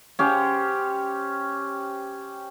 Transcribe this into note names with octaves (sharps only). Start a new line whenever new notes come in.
C#4 G4 C5